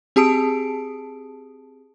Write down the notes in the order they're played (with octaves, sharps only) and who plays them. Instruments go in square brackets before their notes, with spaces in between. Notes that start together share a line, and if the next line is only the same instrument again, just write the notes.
[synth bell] C4 G4 G#4 A5 D#6 D7